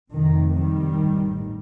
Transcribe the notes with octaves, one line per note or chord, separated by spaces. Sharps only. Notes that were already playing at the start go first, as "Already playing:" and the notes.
F1 F2 C3 D#3
D#3 G3
A1 G2